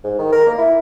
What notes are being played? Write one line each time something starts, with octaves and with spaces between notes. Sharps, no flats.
G#2
D#3
A#4
A#3
E4